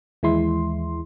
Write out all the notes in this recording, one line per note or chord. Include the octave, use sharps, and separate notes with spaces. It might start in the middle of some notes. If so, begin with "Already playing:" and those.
D#2 E3 G#3 E4 C6